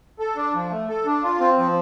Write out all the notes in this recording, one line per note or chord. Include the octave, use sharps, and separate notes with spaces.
A4
D4
F3
A3
A4
D4
F4
C4
F3